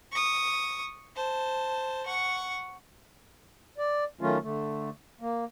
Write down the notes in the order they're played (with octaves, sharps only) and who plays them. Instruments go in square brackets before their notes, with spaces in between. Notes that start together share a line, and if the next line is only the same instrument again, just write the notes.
[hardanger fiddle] C#6 D#6
C5 A5
F#5 C#6
[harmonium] D5
D#3 F#3 A3 C#4 F4
D3 A3
A#3